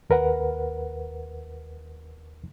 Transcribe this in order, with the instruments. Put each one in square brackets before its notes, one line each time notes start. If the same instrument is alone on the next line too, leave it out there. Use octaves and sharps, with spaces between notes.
[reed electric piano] D#2 A#4 B4 F#5